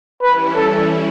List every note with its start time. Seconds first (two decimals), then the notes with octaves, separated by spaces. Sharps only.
0.21 E3 G3 C#4 E4 B4
0.56 A4